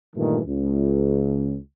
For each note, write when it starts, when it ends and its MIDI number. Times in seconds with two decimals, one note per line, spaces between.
0.14 0.39 43
0.14 0.39 46
0.14 0.39 51
0.14 0.39 52
0.14 0.39 57
0.45 1.56 37